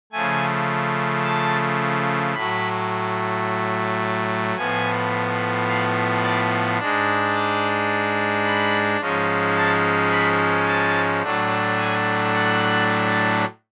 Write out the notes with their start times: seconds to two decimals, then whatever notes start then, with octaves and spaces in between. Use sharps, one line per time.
0.12 C#3 F3 A3 G#5
1.23 A5
2.34 A2 F#3 A3 B5
4.57 A2 F3 B3 G#5
5.68 F5
6.23 D5
6.79 G#2 G#3 D4
7.34 D5
8.45 B5
9.00 G#2 F3 G#3 C#4
9.56 A5
10.12 B5
10.68 A5
11.23 A2 F#3 A3 D4
11.78 G#5
12.33 F#5